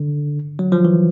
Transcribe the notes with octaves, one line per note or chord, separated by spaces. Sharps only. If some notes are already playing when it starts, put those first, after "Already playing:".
Already playing: D3
F#3
F3
E3